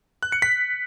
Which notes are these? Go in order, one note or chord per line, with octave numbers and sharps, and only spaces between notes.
F#6
C#7
B6